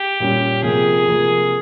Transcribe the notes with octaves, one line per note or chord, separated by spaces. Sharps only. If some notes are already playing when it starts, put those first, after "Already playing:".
Already playing: G4
A#2 G3 C#4
C3 F3 A#3 F4 G#4 A#4
C3 F3 A#3 F4 A#4